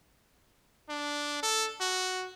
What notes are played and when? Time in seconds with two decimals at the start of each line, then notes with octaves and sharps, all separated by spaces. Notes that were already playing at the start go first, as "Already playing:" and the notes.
0.89 D4
1.43 A4
1.80 F#4